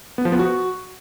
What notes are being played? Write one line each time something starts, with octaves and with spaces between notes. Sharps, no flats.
B3
F3
B3
F#4